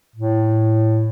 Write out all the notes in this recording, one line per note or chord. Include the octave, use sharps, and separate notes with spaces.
A2